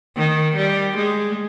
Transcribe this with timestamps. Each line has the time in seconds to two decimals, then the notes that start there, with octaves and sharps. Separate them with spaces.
0.17 D#3
0.56 G3
0.97 G#3